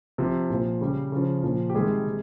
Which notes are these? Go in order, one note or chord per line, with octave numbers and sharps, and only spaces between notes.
C3 F3
A#2 F3
C#3 G3
C#3 F3
A#2 F3
G4
C3 D#3 G3 G#3 G#4
C3